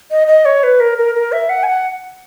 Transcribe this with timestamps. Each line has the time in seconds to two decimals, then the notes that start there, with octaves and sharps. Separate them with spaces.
0.11 D#5
0.27 D#5
0.45 C#5
0.63 B4
0.80 A#4
0.98 A#4
1.15 A#4
1.32 E5
1.49 F#5
1.63 G#5
1.68 F#5